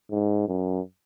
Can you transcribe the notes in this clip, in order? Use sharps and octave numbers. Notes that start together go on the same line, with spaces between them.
G#2
F#2